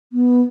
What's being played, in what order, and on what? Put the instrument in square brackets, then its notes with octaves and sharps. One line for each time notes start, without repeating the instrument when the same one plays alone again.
[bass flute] B3